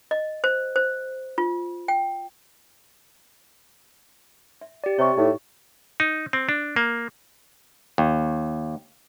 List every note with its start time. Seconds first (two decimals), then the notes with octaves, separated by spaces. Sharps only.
0.11 D#5
0.44 C5
0.76 C5
1.38 F4
1.88 G5
4.61 E5
4.84 G4 D5
4.98 C3 C#5 C#6
5.17 A2 D#4
6.00 D#4
6.33 C4
6.49 D4
6.76 A#3
7.98 D#2